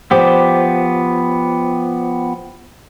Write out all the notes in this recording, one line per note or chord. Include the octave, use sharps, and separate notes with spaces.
F3 B3 G4 D5